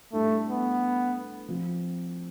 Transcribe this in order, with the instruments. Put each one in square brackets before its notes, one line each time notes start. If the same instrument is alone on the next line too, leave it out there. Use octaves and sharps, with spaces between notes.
[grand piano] A2 G3 D4 A4 [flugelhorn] A3
[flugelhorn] B3
[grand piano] F3 C4